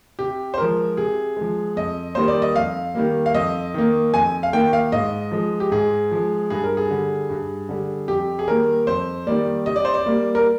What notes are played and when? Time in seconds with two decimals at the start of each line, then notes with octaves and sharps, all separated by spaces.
0.19 C3 G4
0.54 C5
0.58 F3 G#3 A#4
0.97 C3 G#4
1.37 F3 G#3
1.77 F2 D#5
2.15 D#3 G3 A#3 C5
2.28 D5
2.42 D#5
2.55 F2 F5
2.95 D#3 G3 A#3
3.26 F5
3.35 F2 D#5
3.74 D#3 A#3
4.13 F2 G#5
4.43 F5
4.53 D#3 A#3 G5
4.73 F5
4.92 G#2 D#5
5.32 F3 G#3
5.60 G4
5.72 G#2 G#4
6.11 F3 G#3
6.50 G2 G#4
6.64 A#4
6.77 G#4
6.91 D3 G3
7.30 G2
7.69 D3 G3
8.08 F2 G4
8.39 G#4
8.48 D#3 G3 A#3 A#4
8.87 F2 C5
9.27 D#3 G3 A#3 D5
9.66 C3 D#5
9.76 D5
9.85 C5
9.94 D5
10.06 G3 A#3
10.35 A#4